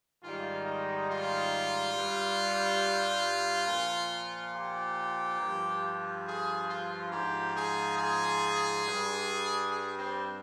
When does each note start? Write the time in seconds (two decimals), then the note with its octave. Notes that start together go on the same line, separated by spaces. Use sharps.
0.22 G#2 D#3 G3 F4
0.65 D#4
1.08 F4
1.94 G2 G3
3.66 A#2 F3
4.52 G4
5.38 G2 F3
6.25 G#4
6.68 F4
7.10 G#2 F3 G4
7.54 G#4
7.96 G#4
8.83 G2 G3
9.69 G#4
9.98 C4